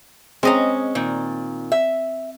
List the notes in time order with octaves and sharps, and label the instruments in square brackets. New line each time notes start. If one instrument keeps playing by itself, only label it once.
[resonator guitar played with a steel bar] G#3 C#4 [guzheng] C4 D#5 A#5
[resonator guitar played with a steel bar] A#2 D#3
E5